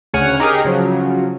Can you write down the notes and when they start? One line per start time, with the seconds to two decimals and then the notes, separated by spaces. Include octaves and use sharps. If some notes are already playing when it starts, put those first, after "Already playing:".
0.14 D2 C#3 C#5 F#5 G#5 F6
0.40 D#4 G4 G#4 A#4
0.65 C#3 F3 F#3